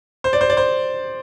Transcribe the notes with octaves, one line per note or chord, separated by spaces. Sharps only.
C5
D5
C5
D5
C5